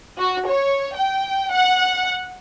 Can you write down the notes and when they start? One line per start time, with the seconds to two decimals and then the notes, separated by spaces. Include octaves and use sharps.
0.19 F#4
0.48 C#5
0.96 G5
1.52 F#5